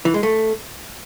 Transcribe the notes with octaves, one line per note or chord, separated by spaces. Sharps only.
E3
G#3
A3